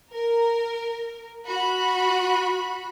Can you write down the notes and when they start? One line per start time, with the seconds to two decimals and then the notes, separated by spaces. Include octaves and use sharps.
0.13 A#4
1.46 F#4 B5 F#6